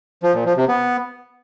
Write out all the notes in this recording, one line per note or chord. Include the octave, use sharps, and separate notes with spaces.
F3
A#2
F3
C3
B3